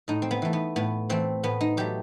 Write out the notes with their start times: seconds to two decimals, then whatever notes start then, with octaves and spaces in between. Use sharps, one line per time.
0.08 A2 D#4
0.22 C4
0.31 B3
0.42 E3 A3
0.53 B3
0.76 A2 B3
1.09 E3 A3 C4
1.43 A2 B3
1.61 D#4
1.77 F#3 A3 G4